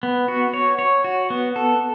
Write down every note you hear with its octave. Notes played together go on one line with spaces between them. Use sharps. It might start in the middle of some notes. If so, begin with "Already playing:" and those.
B3
F#4
C#5
C#5
F#4
B3
A4